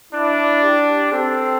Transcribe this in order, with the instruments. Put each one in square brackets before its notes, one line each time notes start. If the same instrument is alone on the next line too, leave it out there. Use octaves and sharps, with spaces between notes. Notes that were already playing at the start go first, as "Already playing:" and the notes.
[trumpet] D4 [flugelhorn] E4
[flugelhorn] G4
[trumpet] C4 [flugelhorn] A4